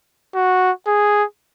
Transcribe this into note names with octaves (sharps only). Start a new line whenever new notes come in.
F#4
G#4